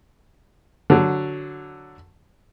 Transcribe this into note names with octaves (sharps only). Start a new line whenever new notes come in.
D3 F#3